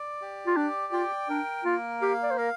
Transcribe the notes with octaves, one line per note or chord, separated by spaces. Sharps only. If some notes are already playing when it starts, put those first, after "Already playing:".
Already playing: D5
G4
F4
D4 D5
F4 G5
D4 A#4
A#3 F4
G4 F5
D5
C5
A#4 F5